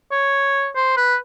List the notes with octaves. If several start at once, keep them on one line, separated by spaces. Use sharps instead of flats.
C#5
C5
B4